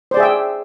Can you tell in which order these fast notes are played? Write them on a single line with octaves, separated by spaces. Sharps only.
C5 D5 G#4 E5 G5